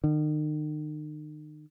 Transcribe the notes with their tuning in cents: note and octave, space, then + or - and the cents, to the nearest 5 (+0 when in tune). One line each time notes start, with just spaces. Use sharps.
D#3 -40